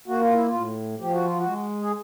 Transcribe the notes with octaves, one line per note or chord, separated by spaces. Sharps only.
A#3 F#4
F4
E4
F4
A2
F3 G4
F#4
F4
F#4
G#3
G#4